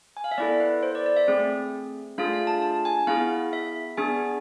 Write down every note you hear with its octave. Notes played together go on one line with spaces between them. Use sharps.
G#5
F5
E5
B3 E4 A4 D5
B4
C5
D5
D5
E5
A3 C4 G#4
A3 D4 F4 G#4 F5
F5
A5
A5
G#5
B3 E4 G#4 F5
E5
B3 D4 G#4 G#5